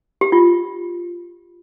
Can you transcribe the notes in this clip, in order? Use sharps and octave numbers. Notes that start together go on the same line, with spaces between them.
G4
F4